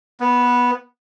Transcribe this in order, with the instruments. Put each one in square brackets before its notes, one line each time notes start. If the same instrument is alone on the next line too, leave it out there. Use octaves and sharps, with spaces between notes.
[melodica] B3